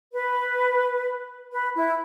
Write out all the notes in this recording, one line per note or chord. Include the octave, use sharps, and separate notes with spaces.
B4
B4
E4